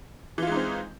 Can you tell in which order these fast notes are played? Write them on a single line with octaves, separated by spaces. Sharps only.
E3 F4 G#3 D#4 C4